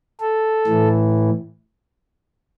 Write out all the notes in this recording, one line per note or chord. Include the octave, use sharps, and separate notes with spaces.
A4
A2 E3